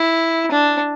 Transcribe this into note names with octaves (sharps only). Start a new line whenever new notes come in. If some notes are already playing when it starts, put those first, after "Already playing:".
Already playing: E4
D4